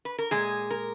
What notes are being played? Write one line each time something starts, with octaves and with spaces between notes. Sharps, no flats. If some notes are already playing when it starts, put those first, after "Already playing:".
B4
A#4
A#2 G#3 G#4
A#4